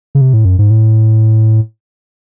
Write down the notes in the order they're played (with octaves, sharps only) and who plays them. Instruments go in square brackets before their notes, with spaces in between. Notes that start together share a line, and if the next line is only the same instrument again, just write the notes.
[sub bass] C#3
C3
A2
F#2
G#2
A2